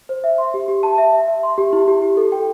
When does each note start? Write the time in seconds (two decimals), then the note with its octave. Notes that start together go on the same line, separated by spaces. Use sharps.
0.09 C5
0.24 E5
0.38 C6
0.54 G4
0.68 G4
0.83 A5
0.98 E5
1.13 E5
1.28 E5
1.43 C6
1.58 G4
1.73 E4
1.88 G4
2.02 G4
2.17 A4
2.32 G5